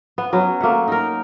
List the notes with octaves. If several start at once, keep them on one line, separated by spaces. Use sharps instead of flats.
B3
F#3 B3 C#4
A3 A#3 E5 F#5
D#4 A#4